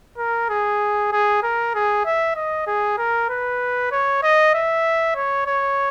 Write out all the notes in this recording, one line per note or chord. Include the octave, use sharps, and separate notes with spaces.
A#4
G#4
G#4
A#4
G#4
E5
D#5
G#4
A#4
B4
C#5
D#5
E5
C#5
C#5